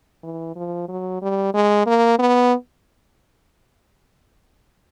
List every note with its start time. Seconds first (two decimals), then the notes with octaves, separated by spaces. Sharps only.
0.23 E3
0.56 F3
0.89 F#3
1.22 G3
1.54 G#3
1.86 A#3
2.19 B3